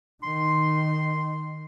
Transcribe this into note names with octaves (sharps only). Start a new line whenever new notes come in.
D#3 C6